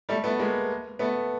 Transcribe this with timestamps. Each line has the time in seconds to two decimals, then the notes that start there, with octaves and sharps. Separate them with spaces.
0.09 G3 A3
0.24 A3 B3
0.39 G#3 A#3
0.99 A3 B3